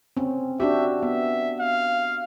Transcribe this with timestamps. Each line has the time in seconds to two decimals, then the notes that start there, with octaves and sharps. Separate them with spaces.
0.17 C4 C#4
0.60 D4 F#4 G4 E5
1.03 B3 E5
1.60 F5